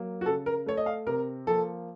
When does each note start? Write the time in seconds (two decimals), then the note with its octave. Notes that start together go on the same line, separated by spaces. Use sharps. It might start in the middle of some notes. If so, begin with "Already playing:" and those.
Already playing: F#3 A#3
0.21 F#4
0.26 C#3 A4
0.46 A#4
0.66 A3 C#5
0.77 D#5
0.86 F5
1.06 C3 A#4
1.47 F3 A#3 A4